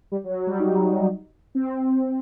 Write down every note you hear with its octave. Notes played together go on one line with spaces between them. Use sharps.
G3
F#3
F#3
G3
D#4
C4